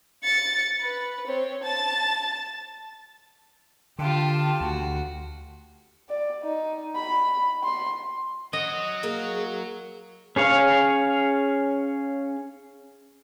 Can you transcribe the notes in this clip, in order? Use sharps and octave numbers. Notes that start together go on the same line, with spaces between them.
A6 C#7
B4
C4 C#5
A5 A6
D3 F4 G4 G5 A5 C6
D2 F#4
D5
D#4
B5
C6
F#3 F#4 D#5
A#3 G#4 A#4
C#4 G#4 C#5 F5